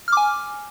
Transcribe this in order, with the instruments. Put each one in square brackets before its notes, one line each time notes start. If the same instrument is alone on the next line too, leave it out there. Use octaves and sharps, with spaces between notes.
[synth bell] F6
D6
G#5